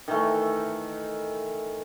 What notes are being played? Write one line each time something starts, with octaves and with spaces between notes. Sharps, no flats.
D#3 E3 A3